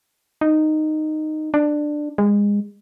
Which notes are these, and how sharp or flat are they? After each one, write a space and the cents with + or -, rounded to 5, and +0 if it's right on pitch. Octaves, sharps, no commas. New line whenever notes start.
D#4 -10
D4 +15
G#3 -25